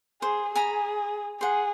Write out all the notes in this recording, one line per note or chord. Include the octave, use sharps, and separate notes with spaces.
G#4 C5
G#4 G#5 A#5 B5
G#4 C5 F#5